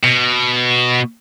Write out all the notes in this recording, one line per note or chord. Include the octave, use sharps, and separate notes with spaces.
B2